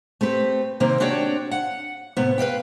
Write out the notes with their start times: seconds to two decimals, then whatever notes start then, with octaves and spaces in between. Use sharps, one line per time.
0.21 A3 C4 G4 B4
0.80 C3 D#3 A#3 C4
1.00 C4 D4 F#4 G4 C#5 D5
1.51 F#5
2.17 A2 C3 B3
2.38 B4 D#5 F5 G5